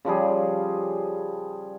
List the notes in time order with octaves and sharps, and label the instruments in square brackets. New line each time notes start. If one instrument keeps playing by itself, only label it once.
[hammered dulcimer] C#3 F3 G3 G#4